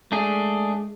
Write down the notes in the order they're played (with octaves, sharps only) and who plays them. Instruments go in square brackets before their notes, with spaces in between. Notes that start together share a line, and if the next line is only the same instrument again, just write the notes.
[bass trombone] G#3 [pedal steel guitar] A3 D4 G#4